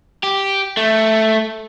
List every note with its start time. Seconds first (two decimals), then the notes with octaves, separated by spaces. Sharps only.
0.24 G4
0.77 A3